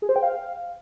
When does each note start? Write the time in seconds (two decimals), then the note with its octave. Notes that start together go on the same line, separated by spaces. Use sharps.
0.02 G#4
0.09 C5
0.16 G5
0.23 F5